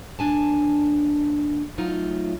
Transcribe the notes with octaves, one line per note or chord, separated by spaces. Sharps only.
D#2 D4 G#5 A5
F#3 A3 D#4 F4